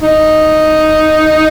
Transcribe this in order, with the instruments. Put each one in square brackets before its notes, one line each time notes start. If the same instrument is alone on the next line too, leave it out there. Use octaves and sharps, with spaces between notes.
[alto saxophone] D#4